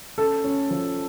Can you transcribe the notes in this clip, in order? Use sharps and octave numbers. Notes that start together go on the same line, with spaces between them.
C#4 A4
C#4
F3